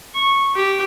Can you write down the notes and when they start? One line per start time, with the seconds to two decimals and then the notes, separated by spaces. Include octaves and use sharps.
0.14 C#6
0.55 G4